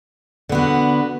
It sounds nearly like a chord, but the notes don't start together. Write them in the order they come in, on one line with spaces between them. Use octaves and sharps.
D3 B3 F#4